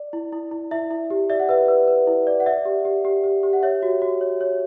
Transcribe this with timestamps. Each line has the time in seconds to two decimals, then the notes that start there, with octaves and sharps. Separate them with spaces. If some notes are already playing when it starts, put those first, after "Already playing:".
Already playing: D5
0.13 E4
0.32 E4
0.51 E4
0.71 E4 E5
0.91 E4
1.10 G4
1.30 D5 E5
1.40 F#5
1.49 B4 E5
1.68 B4
1.88 B4
2.07 E4
2.27 D5
2.40 F#5
2.46 D5 E5
2.65 G4
2.85 G4
3.05 G4
3.24 G4
3.43 G4
3.53 F#5
3.63 C#5 E5
3.83 F#4
4.02 F#4
4.21 C#5
4.41 C#5